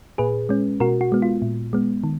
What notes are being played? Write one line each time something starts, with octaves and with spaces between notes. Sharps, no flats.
A#2 G#4 B4
G#3 C#4
B2 F#4 A#4
F#4
G#3 B3
F4
A#2
G#3 B3
D#3